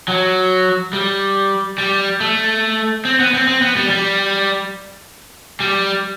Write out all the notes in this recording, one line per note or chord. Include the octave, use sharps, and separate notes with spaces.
F#3
G3
G3
A3
C4
B3
C4
C4
B3
G3
G3
G3